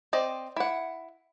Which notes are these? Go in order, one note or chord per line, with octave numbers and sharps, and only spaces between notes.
C4 D5 D#5
E4 F#5